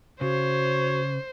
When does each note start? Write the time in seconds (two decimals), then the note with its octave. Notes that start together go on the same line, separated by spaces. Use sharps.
0.21 C#3 F#4 C5 C#5